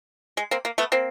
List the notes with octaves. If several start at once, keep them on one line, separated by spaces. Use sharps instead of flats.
G#3
A#3 C4
A#3
A3 B3
A#3 C4